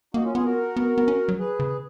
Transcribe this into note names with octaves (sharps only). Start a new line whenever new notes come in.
A#3 D#4 F#4
C#4 F4
B3 F4 G#4
F#4 A#4
B3
B3
C#4
F#3
G#4 B4
C#3